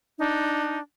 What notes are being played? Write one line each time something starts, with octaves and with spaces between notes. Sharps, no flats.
D4 D#4